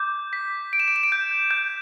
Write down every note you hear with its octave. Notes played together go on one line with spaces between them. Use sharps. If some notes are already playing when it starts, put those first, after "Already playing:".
Already playing: D6 G6
B6
D7
E7
D7
E7
D7
G6
G6